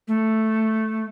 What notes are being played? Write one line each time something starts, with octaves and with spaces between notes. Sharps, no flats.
A3